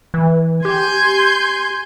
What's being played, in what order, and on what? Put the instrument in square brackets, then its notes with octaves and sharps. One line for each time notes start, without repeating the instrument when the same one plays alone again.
[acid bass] E3
[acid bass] G4 [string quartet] G#5 C6 G6